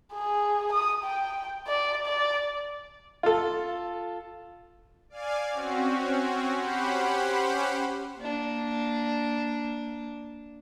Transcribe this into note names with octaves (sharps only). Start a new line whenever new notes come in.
G#4
D#6
G5
D5
D5
F4 A4
D5 F5 G#5
C4 C#4 F#4
C#4 G4 C5 F#5 B5
A#3 D4